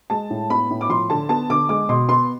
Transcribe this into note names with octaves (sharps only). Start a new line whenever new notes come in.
G#3 A5
A2
B3 B5
A2
D6
F3 C6
D3 A5
B3 A5
D3 D6
G#3 D6
B2 C6
B3 C6